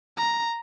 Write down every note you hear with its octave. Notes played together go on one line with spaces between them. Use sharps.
A#5